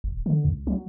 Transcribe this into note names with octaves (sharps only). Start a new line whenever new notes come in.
D#1
D3
C#2
F#3